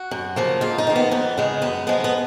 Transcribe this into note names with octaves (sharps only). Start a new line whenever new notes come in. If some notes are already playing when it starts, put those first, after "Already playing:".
Already playing: F#4
F#2
C#3 F3 A#3
G#2 F4
D#4
D#3 A#3
B3
F2 B3
C#3 G#3
F#2 B3
F3 G#3 B3
B3